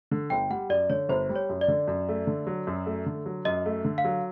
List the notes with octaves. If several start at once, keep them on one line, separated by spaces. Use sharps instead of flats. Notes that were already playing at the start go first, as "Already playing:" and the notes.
D3
G1 G5
G3 F#5
F#2 D5
D3 C#5
G1 C5
G3
C#5
F#2
D5
D3
F#2
A3
D3
F#3
F#2
A3
D3
F#3
F#2 D#5
A3
D3
F5
F#3